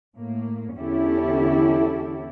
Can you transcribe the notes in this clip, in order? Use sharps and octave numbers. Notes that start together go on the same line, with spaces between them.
A2 A#3
E2 D3 C#4 E4 G4 A4